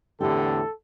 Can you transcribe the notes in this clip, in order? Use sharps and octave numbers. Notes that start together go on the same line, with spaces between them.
E2 A2 D3 C4 E4 G4 A4